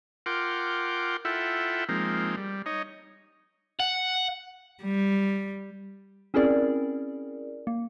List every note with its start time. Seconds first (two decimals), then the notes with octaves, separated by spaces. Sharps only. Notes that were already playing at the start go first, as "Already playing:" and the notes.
0.26 F4 A#4 F#5 G5 C6 D6
1.25 E4 F4 A4 E5 F#5 G5
1.89 F3 G#3 A#3 C4 D#4
2.37 G3
2.66 D#4 C#5 D#5
3.80 F#5
4.83 G3
6.34 C4 C#4 E4 G#4 A#4 D5
7.67 A#3